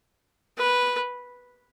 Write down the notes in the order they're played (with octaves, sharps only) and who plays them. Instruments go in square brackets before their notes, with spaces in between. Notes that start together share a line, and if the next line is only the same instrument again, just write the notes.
[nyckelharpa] B4